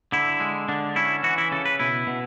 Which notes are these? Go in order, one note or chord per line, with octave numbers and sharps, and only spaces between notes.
D3 E4
G#3
D3 D4
C#4 E4
E3 F#4
E4
C#3 A4
B4
B2 E4
B2